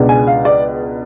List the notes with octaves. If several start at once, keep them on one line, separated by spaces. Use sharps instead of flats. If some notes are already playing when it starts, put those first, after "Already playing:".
Already playing: C#2 B2 G#3 D4
G#5
F5
D5